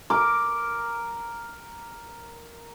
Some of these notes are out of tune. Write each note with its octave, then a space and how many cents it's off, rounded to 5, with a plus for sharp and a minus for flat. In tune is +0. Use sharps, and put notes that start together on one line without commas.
A#4 +0 D6 +0